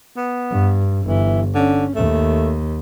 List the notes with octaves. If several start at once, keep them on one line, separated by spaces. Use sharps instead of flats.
B3
G2
G1 E3
D3 C#4
D#2 A3